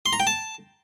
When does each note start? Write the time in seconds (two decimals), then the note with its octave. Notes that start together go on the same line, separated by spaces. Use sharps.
0.06 C6
0.13 A#5
0.20 G5
0.27 A5